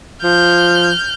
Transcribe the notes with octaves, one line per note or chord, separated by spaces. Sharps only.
F3 F6 G6